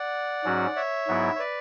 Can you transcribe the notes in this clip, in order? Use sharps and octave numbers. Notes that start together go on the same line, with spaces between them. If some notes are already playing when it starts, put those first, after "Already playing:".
Already playing: D5 F#5
G#2 F#3 C#4 F#4
C#5 E5
G#2 F#3 B3 E4
C#5
B4 D5